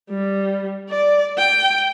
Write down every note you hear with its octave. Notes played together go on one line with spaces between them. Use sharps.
G3
D5
G5